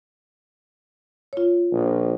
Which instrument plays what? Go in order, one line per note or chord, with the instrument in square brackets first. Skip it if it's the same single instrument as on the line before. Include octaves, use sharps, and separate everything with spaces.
[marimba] F4 C#5
[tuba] A#1